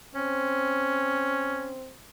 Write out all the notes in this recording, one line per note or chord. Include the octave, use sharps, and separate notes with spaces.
C4 C#4